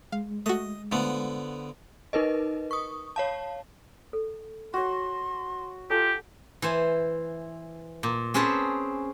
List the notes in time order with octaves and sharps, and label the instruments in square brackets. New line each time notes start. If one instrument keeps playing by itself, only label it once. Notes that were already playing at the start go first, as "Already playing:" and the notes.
[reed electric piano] G#3 [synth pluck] F5
[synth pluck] A3 F#4 [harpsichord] D#5
[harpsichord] D3 F3 B3 [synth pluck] A3
[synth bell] D#4 A#4 B4 D#5
C#6 D#6
C#5 F5 A5
[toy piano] A4
[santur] F#4 C#5 [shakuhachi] C6
[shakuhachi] F4 [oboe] G4 [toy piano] A4 G#5 A5
[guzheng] E3 C5 G#5
A#2
C4 C#4 G#4 B4 C5 A5